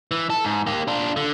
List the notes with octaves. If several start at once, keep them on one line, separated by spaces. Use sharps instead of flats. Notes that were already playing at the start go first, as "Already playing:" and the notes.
E3
A4
G#2
A#3 G4
D4 F4
D3